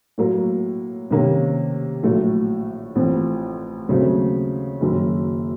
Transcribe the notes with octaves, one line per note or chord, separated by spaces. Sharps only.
A2 F#3 A#3
C3 D#3 A#3 C#4
A#1 A2 F#3 A3
A1 A2 F3 C4
D#2 C#3 F#3 A3 C4
F#1 F#2 D#3